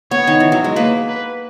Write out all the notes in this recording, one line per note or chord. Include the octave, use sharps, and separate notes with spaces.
B3 C#5
D#3
E3
F#3
G#3
A#3 B4
B4